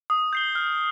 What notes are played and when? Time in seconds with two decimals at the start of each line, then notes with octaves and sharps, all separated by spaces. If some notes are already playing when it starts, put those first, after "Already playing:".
0.10 D#6
0.33 G6 C7 G7
0.55 F6